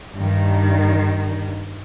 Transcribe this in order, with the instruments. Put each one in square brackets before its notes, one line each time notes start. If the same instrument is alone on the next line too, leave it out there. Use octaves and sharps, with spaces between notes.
[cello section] G2 D#3